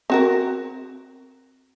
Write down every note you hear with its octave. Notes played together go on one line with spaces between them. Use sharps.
C4 F#4 A#4